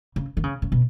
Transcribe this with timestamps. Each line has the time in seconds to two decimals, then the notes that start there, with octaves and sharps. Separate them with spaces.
0.16 C#3
0.37 D#3
0.44 C#3
0.62 C#3
0.72 B2